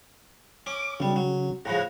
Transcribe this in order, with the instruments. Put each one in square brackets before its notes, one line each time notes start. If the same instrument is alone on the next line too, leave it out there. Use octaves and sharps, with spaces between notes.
[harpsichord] C#4 [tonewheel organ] D6
[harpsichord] B1 G3 [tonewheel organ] C#3
[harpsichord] F#3
[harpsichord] A2 C#3 F3 [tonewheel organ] G#4 F#5 A#5